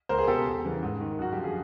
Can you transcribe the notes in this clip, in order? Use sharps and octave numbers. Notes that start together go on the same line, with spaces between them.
C#2 A#4 C5
G#4
B2 G4 A4
E2
C#3 E3
G#2
D#3
F#2 F#4
D3 F3 G4
G#4